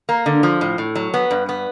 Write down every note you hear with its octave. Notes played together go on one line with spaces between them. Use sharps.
A#3
D3
F3
A2
A2
F#3
B3
G2
B3